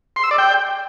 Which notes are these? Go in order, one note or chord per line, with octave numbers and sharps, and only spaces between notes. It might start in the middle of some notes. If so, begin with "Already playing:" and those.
C6
E6
D5
G5